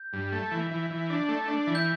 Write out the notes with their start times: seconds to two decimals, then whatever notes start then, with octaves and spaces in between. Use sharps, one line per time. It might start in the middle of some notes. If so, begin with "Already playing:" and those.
Already playing: G6
0.13 G2
0.32 A3
0.51 E3
0.71 E3
0.90 E3
1.10 D4
1.29 A3
1.48 D4
1.67 E3
1.75 G6